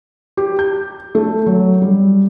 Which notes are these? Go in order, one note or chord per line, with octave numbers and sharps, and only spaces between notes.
G4
G6
A3
F#3
G3